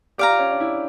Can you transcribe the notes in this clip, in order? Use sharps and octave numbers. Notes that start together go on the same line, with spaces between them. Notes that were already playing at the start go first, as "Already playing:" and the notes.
G4 D5 F5 A#5
F4
C#4
D4
E4